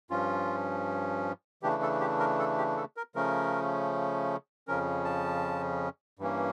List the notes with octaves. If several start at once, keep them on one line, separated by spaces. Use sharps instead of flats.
G2 F3 C#4 F4
C#3 E3 A3 D4 G4
A4
G4
A#4
A4
G4
A4
A#4
C#3 F3 A3 C#4 A#4
F2 C#3 F3 C#4 A#4
A5
G2 E3 A#3 C#4